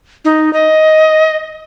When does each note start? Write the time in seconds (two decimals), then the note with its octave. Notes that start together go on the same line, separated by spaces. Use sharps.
0.25 D#4
0.53 D#5